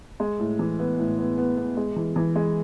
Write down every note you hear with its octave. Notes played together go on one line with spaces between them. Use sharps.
G#3
A2
E3
B3
A2
B3
B3
B3
G#3
E3
E3
G#3